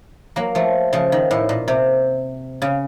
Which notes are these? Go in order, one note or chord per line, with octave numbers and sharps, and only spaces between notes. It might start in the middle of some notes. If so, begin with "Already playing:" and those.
F#3 A#3
F3 A3
C#3 F3
D#3
A2
A#2
C3
C#3